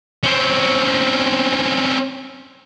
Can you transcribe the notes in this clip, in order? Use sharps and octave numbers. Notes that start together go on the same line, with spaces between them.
C4 C#4